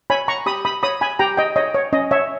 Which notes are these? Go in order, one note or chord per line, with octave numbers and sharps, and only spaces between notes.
C#5 G#5 B5
A#5 C#6
G4 B5 D#6
B5 D#6
C#5 B5 D#6
G#5 B5
G4 G5 A#5
D#5 G5
C#5 D#5
C#5
C#4 D#5
C#5 E5